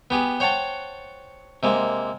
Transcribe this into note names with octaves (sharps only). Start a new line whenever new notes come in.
B3 G4 G#4
C5 C#5 F#5 G5 A5
C3 G#3 A#3